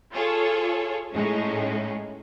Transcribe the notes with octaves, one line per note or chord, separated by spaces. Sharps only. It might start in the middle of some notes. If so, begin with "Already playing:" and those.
F4 G#4 A4 C#5
A2 G#3 C#4 D#4